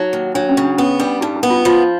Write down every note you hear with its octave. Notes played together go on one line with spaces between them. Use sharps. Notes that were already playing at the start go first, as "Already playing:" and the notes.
Already playing: F#3 D#4
D#2
F#3 D4
C#4
C#3
D4
B3 C#4
G3 D4
G2 D#4
D#4
B3
F4
F3 F4